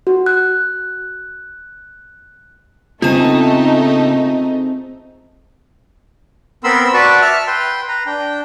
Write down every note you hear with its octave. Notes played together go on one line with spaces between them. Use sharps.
F#4
F#6
C#3 A3 B3 C4 D#4 F4 G#4 E7
B3 C4 A#4 B5 C6 E6
F#4 B4 D5 A5 B5 C#6
E5 A5 F6
B4 G5 C6
B4 A#5
D4 G5